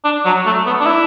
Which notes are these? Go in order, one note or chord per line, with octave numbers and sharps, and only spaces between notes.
D4
F#3
A3
B3
D4
E4